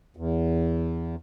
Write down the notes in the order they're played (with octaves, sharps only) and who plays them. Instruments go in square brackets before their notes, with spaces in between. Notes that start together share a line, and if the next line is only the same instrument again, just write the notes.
[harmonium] E2